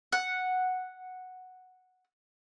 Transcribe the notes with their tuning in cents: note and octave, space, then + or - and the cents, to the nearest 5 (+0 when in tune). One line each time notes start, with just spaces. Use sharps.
F#5 -5